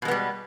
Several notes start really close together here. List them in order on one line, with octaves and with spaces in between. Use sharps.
B2 G#3 B3 G3